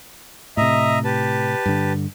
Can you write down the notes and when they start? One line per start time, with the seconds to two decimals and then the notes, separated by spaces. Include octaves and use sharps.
0.57 A2 C3 D#5 E5 A#5
1.05 G4 B4 A5
1.66 G2 D3